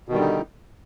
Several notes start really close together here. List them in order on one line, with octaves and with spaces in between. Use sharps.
B2 D#3 G3 D3 D#4